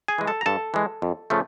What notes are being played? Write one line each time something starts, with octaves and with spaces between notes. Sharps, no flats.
G#4 G#5
E3 G#3
A4 A5
A#5
G2 A4 A5
E3 G#3
F2
C#3 F3 A3